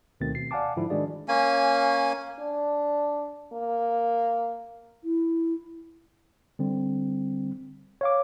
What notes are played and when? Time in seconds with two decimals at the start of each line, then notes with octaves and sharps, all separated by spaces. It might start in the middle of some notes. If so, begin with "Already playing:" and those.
0.20 D2 B2 D#3 A3 C4 A6
0.35 B2 C7
0.51 D5 F5 F#5 G#5 A5 D6
0.76 G#2 D3 F3 E4
0.90 D#3 G#3 D4 F#4 G#4 D5
1.28 A#3 C#4 G#5
2.39 D4
3.53 A#3
5.04 E4
6.59 D3 G3 C4
8.01 C#5 F5 D6